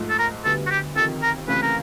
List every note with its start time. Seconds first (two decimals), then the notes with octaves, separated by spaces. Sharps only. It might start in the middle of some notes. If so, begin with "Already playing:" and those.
Already playing: G#2 F3 A3
0.09 A4
0.19 A#4
0.45 D2 D3 G3 B3 A4
0.66 F#4
0.70 G4
0.96 F2 C3 D#3 A4
1.22 A#4
1.48 C#2 C3 E3 A3 C#4 B4
1.62 A#4